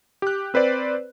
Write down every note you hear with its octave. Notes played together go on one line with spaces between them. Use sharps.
G4 F#6
C4 B4 C5 D5